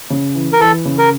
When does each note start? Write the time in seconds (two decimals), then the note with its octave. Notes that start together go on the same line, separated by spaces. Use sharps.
0.10 C#3
0.35 E3
0.53 A#4
0.60 E3 A4
0.85 C#3
0.98 A#4